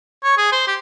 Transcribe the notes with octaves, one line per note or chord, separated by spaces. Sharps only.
C#5
G#4
C5
G4